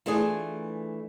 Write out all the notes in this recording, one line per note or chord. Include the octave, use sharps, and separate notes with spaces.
E3 A3 D4 F4 G#4